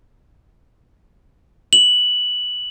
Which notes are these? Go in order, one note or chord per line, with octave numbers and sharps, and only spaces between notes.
F#7